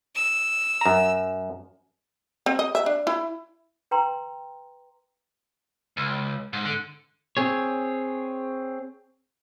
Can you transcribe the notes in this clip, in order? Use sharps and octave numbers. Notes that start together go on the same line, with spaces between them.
E6
F#2 A#5
C4
D#5
E5
D4
E4
B4 G5 A#5 C6
C#2
G#2
D3
C4 G#4 C#5